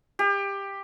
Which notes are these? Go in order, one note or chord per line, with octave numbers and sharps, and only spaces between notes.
G4